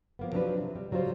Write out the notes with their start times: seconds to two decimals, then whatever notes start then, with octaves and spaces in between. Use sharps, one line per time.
0.19 F3 A#3 B3
0.32 F3 F#3 C4 D4 G4 B4
0.60 C3
0.75 G3
0.91 C#3 F#3 G3 F4 C5